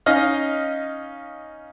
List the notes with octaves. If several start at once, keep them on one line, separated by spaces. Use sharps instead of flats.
C#4 D#4 D#5 F5 F6